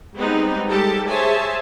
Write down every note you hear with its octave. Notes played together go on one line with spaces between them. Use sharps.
G3 G#3 B3 C4 D#4 G4
G3 G#3 G4 A4 A5
G#4 C5 C#5 E5 G#5 A5